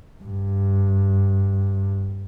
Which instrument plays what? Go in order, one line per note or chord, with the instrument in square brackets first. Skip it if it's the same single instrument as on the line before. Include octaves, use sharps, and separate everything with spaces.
[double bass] G2